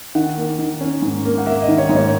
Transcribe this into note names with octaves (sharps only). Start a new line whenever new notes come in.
D#3 F#5
A#3
D#3
C#4
G#2
A#3
F#5
A#3 E5
D#5
D#3
C#5
G#2
C#5